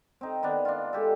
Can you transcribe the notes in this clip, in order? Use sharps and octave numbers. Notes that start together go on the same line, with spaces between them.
C4 D#4
D#3 B3 D4
D4 F4
G#3 G4 A4